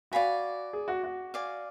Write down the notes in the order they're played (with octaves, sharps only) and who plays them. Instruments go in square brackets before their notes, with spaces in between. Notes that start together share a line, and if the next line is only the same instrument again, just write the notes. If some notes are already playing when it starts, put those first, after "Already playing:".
[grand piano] F#4 [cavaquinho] D5 F5 G#5 B5
[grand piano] G#4
F#4
F#4
[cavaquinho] D5 F5 G#5